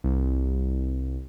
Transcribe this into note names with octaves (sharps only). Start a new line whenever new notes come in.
C2